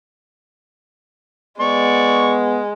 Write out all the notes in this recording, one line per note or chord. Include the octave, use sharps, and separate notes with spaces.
G#3 B3 D5 C#6